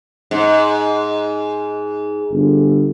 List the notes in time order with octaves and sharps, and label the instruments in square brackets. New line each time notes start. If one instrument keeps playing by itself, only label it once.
[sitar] G#2
[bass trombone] G1